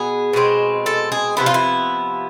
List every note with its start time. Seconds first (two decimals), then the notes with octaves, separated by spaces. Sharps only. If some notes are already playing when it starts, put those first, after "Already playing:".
Already playing: B2 B3 G#4
0.33 B2 G#3 C4
0.86 A4
1.12 G#4
1.37 C3 F3 B3 E4
1.46 F4
1.54 E4